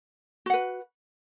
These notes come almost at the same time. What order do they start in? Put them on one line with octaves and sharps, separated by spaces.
F#4 F#5 B4